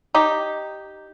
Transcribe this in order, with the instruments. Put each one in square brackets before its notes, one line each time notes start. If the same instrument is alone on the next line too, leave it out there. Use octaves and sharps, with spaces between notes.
[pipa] D#4 G4